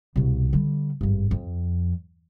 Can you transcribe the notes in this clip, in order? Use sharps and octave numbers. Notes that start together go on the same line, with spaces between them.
C2 B2
D3 G3
G#1 G2
F2